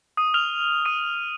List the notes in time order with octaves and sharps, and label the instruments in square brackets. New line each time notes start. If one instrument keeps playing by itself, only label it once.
[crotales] D#6 D#7
F6 F7
D#6 D#7